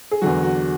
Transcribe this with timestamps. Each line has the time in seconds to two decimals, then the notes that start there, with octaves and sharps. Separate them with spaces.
0.11 G#4
0.22 E2 D3 F#3 F#4
0.43 F#4